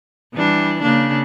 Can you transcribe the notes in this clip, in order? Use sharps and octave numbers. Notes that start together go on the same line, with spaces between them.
E3 G3 D4
C#3 A#3 D4